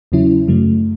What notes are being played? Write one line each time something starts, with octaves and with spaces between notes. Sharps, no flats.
E2 C#3 F#3 C#4 E4
F#2 C#3 F#3 A3